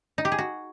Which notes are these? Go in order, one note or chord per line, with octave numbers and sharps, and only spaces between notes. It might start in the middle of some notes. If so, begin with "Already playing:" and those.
D#4
G4
G#4
F#4